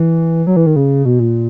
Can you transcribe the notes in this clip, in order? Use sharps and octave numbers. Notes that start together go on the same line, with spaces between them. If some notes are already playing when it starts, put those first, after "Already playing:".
Already playing: E3
F#3
E3
D#3
C#3
B2
A#2